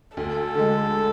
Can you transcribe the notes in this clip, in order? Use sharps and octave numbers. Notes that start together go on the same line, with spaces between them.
D2 A4
D3 G#3